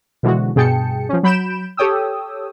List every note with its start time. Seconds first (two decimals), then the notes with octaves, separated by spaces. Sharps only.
0.23 B2 D3 E3 F3 G#3 F#4
0.55 G2 B2 G#4 G5 A5 C#7
1.09 F3 C#4
1.23 F#3 B5 G6 D7 E7
1.77 G4 A4 C#5 G5 D#6 E6